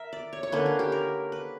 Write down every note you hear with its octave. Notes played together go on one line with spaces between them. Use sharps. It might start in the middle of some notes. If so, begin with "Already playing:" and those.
Already playing: A#4 E5
D5
C#5
C#5
D3 A#3 C#4 B4
A#4
G4
A#4
B4